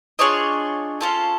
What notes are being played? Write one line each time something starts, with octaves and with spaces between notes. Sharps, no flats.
D4 F4 G#4 C#5 D#5
C#4 F4 A4